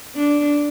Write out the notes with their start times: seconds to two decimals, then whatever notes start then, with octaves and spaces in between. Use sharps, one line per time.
0.16 D4